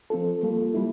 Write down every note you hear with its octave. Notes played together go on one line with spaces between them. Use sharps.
F3 C4 F4 A4
G3 A#3 F4 A4
G3 A#3 E4